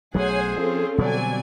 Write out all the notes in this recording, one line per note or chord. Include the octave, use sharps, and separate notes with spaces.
B1 F#3 A3 G#4 C5 C#5 F#5 G#5
F3 C4 C#4 F4 A4
B2 D3 F#3 G3 C4 D5 G#5